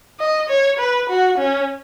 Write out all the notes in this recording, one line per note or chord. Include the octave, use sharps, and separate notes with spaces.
D#5
C#5
B4
F#4
C#4